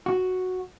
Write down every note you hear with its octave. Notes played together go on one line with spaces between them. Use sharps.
F#4